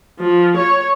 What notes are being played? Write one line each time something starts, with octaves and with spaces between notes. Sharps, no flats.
F3
C#5